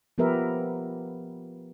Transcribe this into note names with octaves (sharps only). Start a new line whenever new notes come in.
F3 B3 G4 A#4 B4 E5